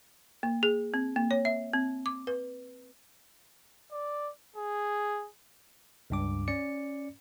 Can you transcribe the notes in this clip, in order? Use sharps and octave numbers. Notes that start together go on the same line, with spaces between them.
A#3
G#4
C4
A#3
C#5
E5
C4
D6
B4
D5
G#4
C#2 G2 D6
C#4 D5 C#7